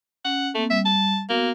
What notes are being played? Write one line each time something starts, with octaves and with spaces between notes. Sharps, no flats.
C#4 F#5
A3 A#3 C4
G3 E5
A5
A#3 B3 F#4 A#4